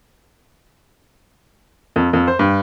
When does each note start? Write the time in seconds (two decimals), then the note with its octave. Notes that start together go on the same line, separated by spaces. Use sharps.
1.96 F2
2.13 F2
2.28 C5
2.39 G2